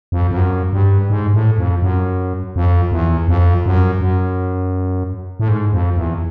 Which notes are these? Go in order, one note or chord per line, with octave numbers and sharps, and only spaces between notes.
F2
F2
F#2
G2
G#2
A2
F2
F#2
F2
E2
F2
F#2
F#2
A2
G#2
F2
E2